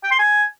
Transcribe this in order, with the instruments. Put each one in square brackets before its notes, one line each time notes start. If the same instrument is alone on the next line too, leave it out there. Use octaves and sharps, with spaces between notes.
[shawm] G5
C6
G#5